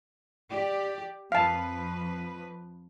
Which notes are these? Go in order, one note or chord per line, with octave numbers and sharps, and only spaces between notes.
G4 D5
F2 F3 B4 F5 A5